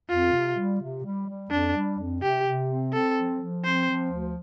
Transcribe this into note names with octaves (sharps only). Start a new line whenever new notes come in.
F2 F4
C3
G3
C3
G3
G3
F2 D4
G3
F2
C3 G4
C3
C4
C4 A4
F3
F3
C4 C5
F3
D2